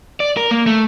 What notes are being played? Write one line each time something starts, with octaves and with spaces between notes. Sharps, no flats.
D5
A#4
A#3
A3